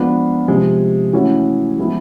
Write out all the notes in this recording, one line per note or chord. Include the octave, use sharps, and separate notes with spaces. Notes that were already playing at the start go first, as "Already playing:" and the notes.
Already playing: F3 G#3 B3 D4 F4
C3 F3 G#3
E3 A3 C#4 F#4
F3 G#3 B3 E4